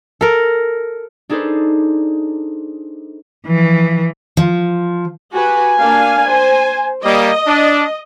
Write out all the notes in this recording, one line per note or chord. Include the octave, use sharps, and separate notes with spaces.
A4 A#4
D4 D#4 G#4 A4 B4 C5
E3 F3
F3
F#4 G4 B4 G#5
A#3 D4 F5
C5
G3 A#3 D#5
D4